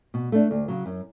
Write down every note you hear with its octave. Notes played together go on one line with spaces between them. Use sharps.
B2
A3 D4
D2
C#3 F#3
F#2